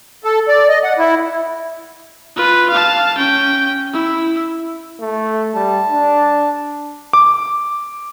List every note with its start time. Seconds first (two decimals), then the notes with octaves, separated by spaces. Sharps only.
0.24 A4
0.48 D5
0.69 D#5
0.84 F#5
0.99 E4
2.36 F4 B4
2.70 F5 A5
3.18 C#4 G5
3.93 E4
5.00 A3
5.55 G3 A5
5.89 D4
7.13 D6